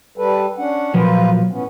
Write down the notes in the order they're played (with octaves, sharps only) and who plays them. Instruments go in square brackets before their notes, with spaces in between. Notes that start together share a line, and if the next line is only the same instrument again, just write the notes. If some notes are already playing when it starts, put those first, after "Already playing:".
[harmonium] G3 A4 B4
C#4 D4 F#5
[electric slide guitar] A#2 F3 F#3 [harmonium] A#3 F4 B4
[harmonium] A2 B3 C#4